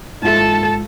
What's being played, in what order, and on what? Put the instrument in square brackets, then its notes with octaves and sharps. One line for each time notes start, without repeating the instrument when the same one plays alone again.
[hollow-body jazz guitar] G#2 F4 E5 [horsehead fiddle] A4 A5